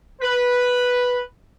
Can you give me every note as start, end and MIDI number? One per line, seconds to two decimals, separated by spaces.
0.22 1.20 71